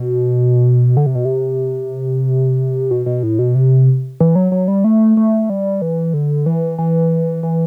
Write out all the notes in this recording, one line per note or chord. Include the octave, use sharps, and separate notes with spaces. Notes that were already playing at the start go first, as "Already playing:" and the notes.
Already playing: B2
D3
C3
B2
C3
B2
B2
A2
B2
C3
E3
F#3
F#3
G3
A3
A3
G3
E3
D3
E3
E3
E3